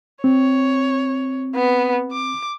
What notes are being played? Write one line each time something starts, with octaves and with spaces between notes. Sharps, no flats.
C4 C#5
B3
D6